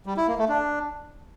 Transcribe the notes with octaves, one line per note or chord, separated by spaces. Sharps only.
G3
E4
A#3
A3
D4